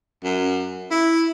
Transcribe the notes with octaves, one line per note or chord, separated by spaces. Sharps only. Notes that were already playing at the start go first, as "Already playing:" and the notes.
F#2
E4